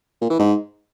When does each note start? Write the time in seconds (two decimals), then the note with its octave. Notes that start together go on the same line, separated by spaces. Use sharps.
0.21 A#2
0.30 E3
0.39 G#2